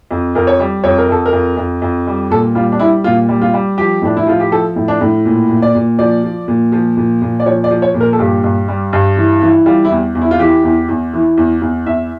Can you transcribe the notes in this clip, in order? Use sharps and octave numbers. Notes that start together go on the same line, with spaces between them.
F2
F2 A#4
C#5
G3
F2 C#5
A#4
F2 A4
A#4
F2
F2
F2
G3
A#2 A4
G3 F4
D4
G3 E4
A#2 F4
G3
F4
G3
F3 G4
A2 D4
E4
F3 F4
G4
F3 A4
A2
D4
A2
A#2
A#2
D5
A#2
F3 D5
F3
A#2
F3
A#2
A#2
D5
F3 C#5
D5
F3
C#5
A#2
A#4
A4
G2 G4
G2
G3
G2
E3
E3
G3 F4
E4
E2
E2
E4
F4
E3 G4
E2
E2
E3
E2
E2
E2 E5